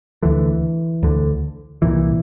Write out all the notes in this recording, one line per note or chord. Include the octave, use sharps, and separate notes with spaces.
D2 D3 E3
D2 D3
C2 A#2 E3